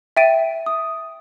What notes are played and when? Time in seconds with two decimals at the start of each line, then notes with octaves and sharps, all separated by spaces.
0.17 E5 G5 A6 D7 D#7
0.66 D#6